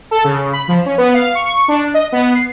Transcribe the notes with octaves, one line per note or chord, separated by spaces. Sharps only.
A4
C#3
B5
F3
C#4
B3
F5
C#6
D4
D#5
B3
C7